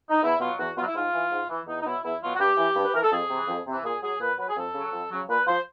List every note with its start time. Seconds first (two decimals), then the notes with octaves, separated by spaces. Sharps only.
0.10 D#4
0.23 E2 E4
0.40 B2 F#3 F4
0.59 E2 F#4
0.77 B2 F#3 F4
0.86 E4
0.95 G#2 F4
1.13 E3
1.32 G#2
1.50 E3
1.67 E2 D#4
1.81 D#4
1.86 B2 F#3 E4
2.04 E2 E4
2.22 B2 F#3 F4
2.35 F#4
2.40 G2 G4
2.58 E3
2.76 G2
2.84 B4
2.94 E3 A#4
3.03 A4
3.12 F2 G#4
3.30 C3 E3
3.48 F2
3.66 C3 E3
3.85 A#2 G#4
4.03 F#3 G#4
4.21 A#2 B4
4.39 F#3 B4
4.49 G#4
4.57 F2 A4
4.75 C#3 F#3
4.93 F2
5.11 C#3 F#3
5.29 A#2 B4
5.47 F3 C5